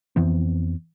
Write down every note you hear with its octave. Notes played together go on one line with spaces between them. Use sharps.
F2 E3 B3 C4